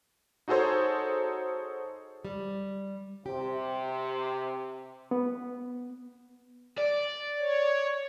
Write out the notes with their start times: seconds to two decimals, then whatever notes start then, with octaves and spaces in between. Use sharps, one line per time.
0.48 D#4 F#4 G#4 A4 C5 C#5
2.25 G3
3.26 C3 G4
5.11 B3
6.78 D5
7.39 C#5